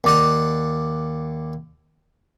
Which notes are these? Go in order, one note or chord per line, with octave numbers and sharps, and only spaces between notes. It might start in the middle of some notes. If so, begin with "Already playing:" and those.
D#2 D5 F#5